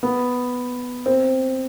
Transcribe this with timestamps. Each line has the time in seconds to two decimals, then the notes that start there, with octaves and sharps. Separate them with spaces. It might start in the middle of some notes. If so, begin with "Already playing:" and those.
0.03 B3
1.06 C4